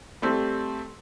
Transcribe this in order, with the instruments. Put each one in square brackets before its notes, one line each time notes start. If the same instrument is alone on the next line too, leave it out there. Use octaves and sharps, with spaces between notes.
[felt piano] G3 A3 C4